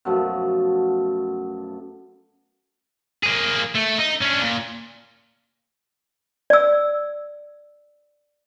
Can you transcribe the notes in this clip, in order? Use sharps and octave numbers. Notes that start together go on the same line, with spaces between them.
F#2 B2 F3 A3
A#3 G#4
A3
D#4
C#4 D4
A#2
D5 E6